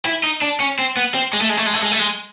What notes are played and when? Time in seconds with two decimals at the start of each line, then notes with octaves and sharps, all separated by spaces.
0.06 E4
0.23 D#4
0.42 D4
0.60 C#4
0.79 C4
0.97 B3
1.14 C4
1.33 G#3
1.41 A3
1.49 G#3
1.57 A3
1.66 G#3
1.74 A3
1.83 G#3
1.91 A3
1.99 G#3